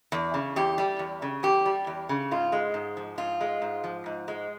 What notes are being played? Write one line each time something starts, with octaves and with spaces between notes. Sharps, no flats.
E2
C#3
E2 G4
G3
E2
C#3
E2 G4
G3
E2
C#3
G#2 F4
G#3
G#2
F3
G#2 F4
G#3
G#2
F3
G#2
G#3